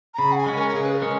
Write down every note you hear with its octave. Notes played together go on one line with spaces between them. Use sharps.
A#5
C#3 B5
F#5
G#5
G#3 C#4
A#4
C#3 G#4
B4
A#4
G#3 C#4